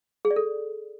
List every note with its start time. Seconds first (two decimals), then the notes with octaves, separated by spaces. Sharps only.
0.25 G#4
0.30 D5
0.36 A4